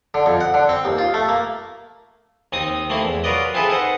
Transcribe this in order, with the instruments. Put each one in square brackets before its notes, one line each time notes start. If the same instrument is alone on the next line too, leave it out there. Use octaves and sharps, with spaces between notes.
[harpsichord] D3
F2
F#5
D3
C4
D#2
F4
A3
A#3
D#2 C4 D#4 D#6
A3 A#3 C4 E4
E2
F#3 F4 A#4 B4 D5 D#5
C4 E4 F4 G#4 A4 B4
D#4 B4 C5 F#5